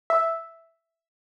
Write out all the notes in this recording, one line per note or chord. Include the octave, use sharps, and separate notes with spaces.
E5